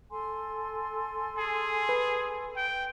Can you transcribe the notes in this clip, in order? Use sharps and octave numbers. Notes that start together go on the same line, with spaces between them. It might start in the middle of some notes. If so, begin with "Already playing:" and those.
A4 G#5 C6
G#4
B4
G5